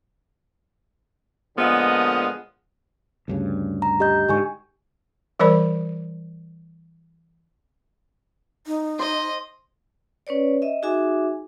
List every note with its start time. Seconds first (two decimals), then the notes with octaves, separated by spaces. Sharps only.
1.57 A#2 D3 F3 G#3 B3 D#5
3.28 D2 G2 C#3
3.82 A#5
4.00 G4 D#5 G6
4.29 G#2 D3 G4 G#5 C#6
5.39 E3 G3 A#4 C5 D5 B5
8.67 D#4
8.99 C5 D#5
10.27 C#4 B4 C#5 D5
10.62 D#5 E5
10.82 D#4 F#4 G#4 E5 G#5 D6